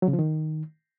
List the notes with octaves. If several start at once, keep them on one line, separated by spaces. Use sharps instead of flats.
F#3
C#3
F3
D#3